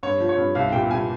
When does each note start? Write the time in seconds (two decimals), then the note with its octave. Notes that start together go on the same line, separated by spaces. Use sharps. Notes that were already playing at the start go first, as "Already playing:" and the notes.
0.03 G2 C#5
0.20 F3
0.29 C#5
0.37 G2
0.55 C2 F5
0.72 A#2 G5
0.90 C2 G#5